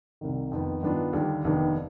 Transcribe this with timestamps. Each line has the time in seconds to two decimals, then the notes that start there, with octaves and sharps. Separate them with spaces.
0.21 C2 C3 D#3
0.52 F2 D#3 B3
0.83 G2 D#3 B3 D4 F4
1.13 D#2 D3 G3
1.44 F1 D#2 D#3 B3 D4